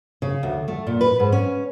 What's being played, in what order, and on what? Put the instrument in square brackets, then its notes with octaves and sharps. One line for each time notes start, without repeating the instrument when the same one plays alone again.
[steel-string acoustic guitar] C#3
D2
A3
A#2
B4
G#2
C#4